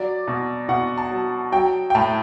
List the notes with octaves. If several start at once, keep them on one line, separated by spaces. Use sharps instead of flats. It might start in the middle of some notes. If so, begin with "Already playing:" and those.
Already playing: F#3 D5
B2
B2 F#5
A5
F#3
F#3 G5
G5
A2 A5